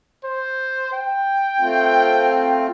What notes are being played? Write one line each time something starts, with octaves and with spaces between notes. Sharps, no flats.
C5
G5
A3 C4 F4